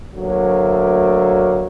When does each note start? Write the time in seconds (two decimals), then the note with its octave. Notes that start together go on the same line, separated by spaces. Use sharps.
0.15 D2 F#3 A3 A#3